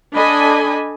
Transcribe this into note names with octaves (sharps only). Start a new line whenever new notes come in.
D4 A4 D#5 G#5 B5